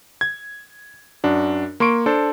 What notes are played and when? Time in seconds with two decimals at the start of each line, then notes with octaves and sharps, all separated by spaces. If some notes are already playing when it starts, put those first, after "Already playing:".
0.21 G#6
1.24 F#2 D4 F#4
1.80 A#3 C6 C#6 D7
2.06 D4 A4 C5